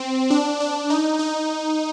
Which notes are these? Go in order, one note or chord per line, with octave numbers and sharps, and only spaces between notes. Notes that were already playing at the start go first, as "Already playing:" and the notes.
Already playing: C4
D4
D4
D#4
D#4